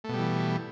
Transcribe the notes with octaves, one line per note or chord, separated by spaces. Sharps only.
B2 E3 G3 A3